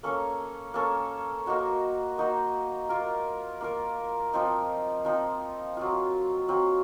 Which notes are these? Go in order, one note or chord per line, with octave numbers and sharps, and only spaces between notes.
A#3 C#4 A4 C#5
A#3 C#4 A4 C#5
A#3 D#4 F#4 C5
A#3 D#4 F#4 C5
A#3 F4 A#4
A#3 F4 A#4
F3 C4 D#4
F3 C4 D#4
F#3 C4 F4
F#3 C4 F4